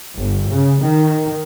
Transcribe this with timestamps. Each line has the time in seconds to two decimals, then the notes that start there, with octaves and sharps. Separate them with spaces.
0.17 G1
0.50 C#3
0.83 D#3